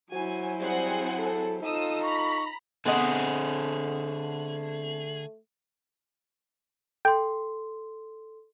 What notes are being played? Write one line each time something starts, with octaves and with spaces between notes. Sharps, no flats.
F#3 E4 F#4 C5 G#5
G3 C4 G#4 F#5
A4
D#4 F4 A4 D#6 E6
A#5 B5 C#6
D3 A3 B3 C4 G#4 D#5
A4 G5 C6